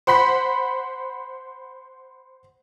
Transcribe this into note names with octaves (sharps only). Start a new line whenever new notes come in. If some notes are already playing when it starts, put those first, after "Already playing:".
C5 F#5 B5 C6 B6